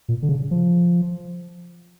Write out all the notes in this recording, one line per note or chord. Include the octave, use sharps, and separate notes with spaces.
A#2
D3
C#3
F3